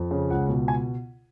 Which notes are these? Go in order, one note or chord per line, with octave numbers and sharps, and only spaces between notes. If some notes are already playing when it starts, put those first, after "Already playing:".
Already playing: F2
C#3
C#2 F#5
B2
G#5